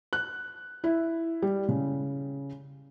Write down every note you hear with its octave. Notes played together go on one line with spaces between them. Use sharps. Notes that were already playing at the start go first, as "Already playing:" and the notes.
F#6
E4
G3
C#3